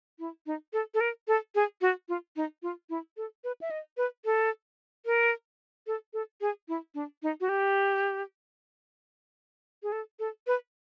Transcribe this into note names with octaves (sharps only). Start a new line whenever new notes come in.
E4
D#4
A4
A4
A#4
A4
G#4
F#4
F4
D#4
F4
E4
A4
B4
E5
D#5
B4
A4
A#4
A4
A4
G#4
E4
D4
D#4
F#4
G4
G#4
A4
A4
B4